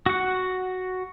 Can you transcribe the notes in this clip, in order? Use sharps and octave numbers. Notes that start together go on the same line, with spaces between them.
F#4 F#5